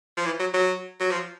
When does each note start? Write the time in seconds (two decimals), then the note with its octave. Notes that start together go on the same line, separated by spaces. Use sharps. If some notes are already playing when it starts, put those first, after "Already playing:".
0.17 F3
0.25 E3
0.40 F#3
0.54 F#3
1.01 F#3
1.12 F3